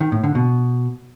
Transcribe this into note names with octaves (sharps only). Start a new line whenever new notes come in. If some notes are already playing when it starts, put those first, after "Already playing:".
D#3
A2
D3
B2